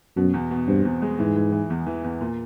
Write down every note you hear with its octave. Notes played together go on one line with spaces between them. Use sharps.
F#2 B2
E2
B2
G2 C4
E2
G#3
G#2 E3
E3
E3
E2
E3
E2
A#2